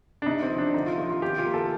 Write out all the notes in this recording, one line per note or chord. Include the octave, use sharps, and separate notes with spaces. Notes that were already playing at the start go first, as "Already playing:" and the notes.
D4
C3 D#4
C4
F3
D4
D3 D#4
F4
F3 F4
F4
D#3 G4
F4
A#3
A4